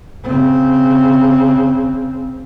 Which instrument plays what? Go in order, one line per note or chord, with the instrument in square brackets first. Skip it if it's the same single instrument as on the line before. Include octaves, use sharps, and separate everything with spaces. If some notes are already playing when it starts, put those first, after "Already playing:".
[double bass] C#3 C4